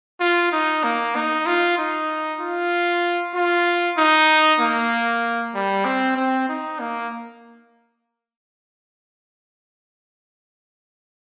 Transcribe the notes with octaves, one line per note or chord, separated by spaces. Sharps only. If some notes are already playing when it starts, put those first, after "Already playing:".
F4
D#4
A#3
D#4
F4
D#4
F4
F4
D#4
A#3
G3
C4
C4
D#4
A#3